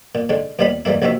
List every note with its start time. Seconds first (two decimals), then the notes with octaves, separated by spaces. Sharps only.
0.15 A#2
0.29 G#2 D3 G#3
0.59 D#2 A#2 D#3 G3 B3 B5
0.85 G#2 E3 G3 A#3 E4
1.02 A#1 C3 D#3 F3 F#4 E5